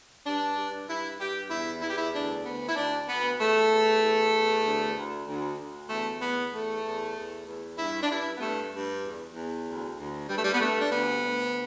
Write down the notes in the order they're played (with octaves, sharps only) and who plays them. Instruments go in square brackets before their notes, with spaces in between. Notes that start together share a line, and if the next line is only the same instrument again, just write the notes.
[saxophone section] G2 D4
G2
G2 E4
G2 G4
E2 E4
E2 E4
G4
E4
D2 D4
D2 B3
E4
D2 D4
D2 B3
E2 A3
E2
E2
E2
D2
D2
D2
D2
E2 A3
E2 B3
E2 A3
E2
E2
E2
G2 E4
D4
G2 E4
B3
G2 A3
G2
E2
E2
D2
D2
G2 G3
A3
G3
B3
G2 A3
D4
D2 B3
D2